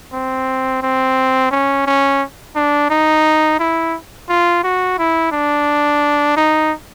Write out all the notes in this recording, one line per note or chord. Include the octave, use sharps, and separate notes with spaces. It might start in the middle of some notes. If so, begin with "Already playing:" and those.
C4
C4
C#4
C#4
D4
D#4
E4
F4
F#4
E4
D4
D#4